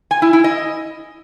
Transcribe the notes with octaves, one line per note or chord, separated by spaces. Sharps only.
G#5
E4
E4
D#5